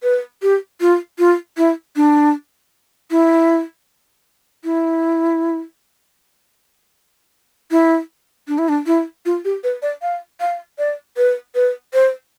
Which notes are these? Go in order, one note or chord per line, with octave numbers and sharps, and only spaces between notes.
B4
G4
F4
F4
E4
D4
E4
E4
E4
D4
E4
D4
E4
F4
G4
B4
D5
F5
F5
D5
B4
B4
C5